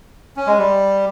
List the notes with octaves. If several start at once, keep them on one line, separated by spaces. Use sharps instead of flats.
C#4
G#3
G3